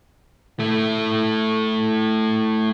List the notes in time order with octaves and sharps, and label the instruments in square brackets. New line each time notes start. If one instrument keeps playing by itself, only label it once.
[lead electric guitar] A3 E4